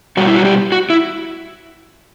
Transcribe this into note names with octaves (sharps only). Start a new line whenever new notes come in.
B2 G3 F#4
E4
F#4
G4
F#4
E4